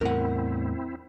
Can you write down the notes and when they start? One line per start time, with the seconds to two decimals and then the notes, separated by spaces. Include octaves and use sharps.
0.01 E2 A2 C4 E4 A#4 F#5